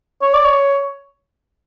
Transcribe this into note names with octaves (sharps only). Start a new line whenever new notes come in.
C#5
D5
C#5